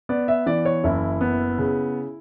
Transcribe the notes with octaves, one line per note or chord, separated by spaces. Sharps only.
B3 D5
E5
E3 D5
C#5
F#1 E4
B3
C#3